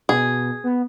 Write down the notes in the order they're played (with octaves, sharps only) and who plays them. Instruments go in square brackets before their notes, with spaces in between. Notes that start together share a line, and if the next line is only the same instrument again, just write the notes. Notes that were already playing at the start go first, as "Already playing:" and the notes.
[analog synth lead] B2 [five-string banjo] G#4
[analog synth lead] B3